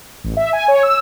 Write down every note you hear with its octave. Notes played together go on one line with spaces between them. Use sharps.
A1
E5
G#5
C#5
E6